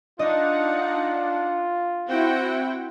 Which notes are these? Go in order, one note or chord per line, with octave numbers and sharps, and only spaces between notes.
D4 D#4 F4 D#5 F#5
C4 E4 F#4 F#5 G5